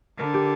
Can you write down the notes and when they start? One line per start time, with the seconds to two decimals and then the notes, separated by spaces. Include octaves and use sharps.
0.19 D3 A#4
0.34 G4